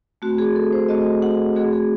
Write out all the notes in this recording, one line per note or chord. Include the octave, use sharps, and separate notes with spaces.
A3 C4 F#4
G#4
A4
C5
A3 C4 F#4 D#5
F#5
A3 C4 F#4 G#4
G#4